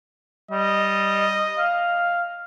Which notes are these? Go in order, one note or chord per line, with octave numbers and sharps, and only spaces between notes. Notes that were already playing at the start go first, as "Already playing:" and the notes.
G3 D#5
F5